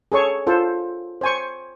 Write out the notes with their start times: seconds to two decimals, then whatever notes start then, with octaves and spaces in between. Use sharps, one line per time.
0.12 G#4 A4 C#5 C#6
0.47 F4 A4 C5
1.21 C5 G#5 C#6